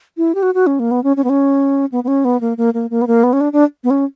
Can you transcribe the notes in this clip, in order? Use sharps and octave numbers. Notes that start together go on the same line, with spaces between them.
E4
G4
F#4
F#4
C#4
A#3
B3
C#4
C#4
B3
C#4
B3
B3
C#4
B3
A#3
A#3
A#3
A#3
B3
A#3
B3
C#4
D4
D4
B3
C#4